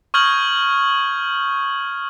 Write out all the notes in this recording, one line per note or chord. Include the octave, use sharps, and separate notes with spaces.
C#6 D#6 F6 G6 G#6 F#7